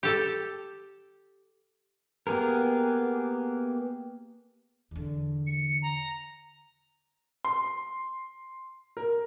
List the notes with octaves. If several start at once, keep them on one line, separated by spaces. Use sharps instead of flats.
G4 A4
A#3 B3 G4 G#4 A#4
E2 D3
C#7
A#5
C6
A#4